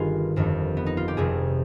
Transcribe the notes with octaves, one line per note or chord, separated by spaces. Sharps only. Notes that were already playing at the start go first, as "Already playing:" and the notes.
Already playing: G1 G2 D#3 F4 G#4 B4
G1 F2 D#3
B3
D#4
F4
G4
F1 F2 C3 G#4